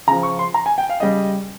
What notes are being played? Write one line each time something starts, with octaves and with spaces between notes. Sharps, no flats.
C#3 F3 A#5
C#6
C6
A#5
G#5
G5
F5
C#3 G3 D#5